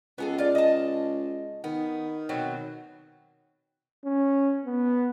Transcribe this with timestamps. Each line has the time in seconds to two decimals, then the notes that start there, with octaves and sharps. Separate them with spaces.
0.18 C#2 B3 G#4 A4
0.38 F4 D5
0.55 D#5 A5
1.64 D#3 B3
2.29 B2 F#3 C4
4.05 C#4
4.65 B3